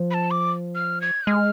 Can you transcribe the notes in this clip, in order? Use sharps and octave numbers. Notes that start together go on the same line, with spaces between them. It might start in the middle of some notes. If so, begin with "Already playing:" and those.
Already playing: F3
B5
A5
D6
F6
G#6
G#3 F6